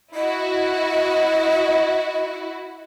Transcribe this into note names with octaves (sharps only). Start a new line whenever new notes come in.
E4 F#4 D#5